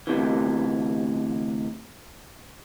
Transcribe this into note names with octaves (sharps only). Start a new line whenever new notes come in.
D2 C3 E3